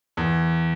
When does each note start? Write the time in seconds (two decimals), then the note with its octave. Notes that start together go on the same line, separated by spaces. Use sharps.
0.17 E2